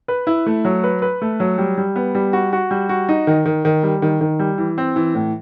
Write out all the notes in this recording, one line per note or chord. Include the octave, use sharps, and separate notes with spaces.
B4
E4
A3
F#3
B4
B4
A3
F#3
G3
G3
B3
G3
F#4
F#4
G3
F#4
D#4
D#3
D#3
D#3
G3
D#3
D#3
G3
E3
C4
E3
A2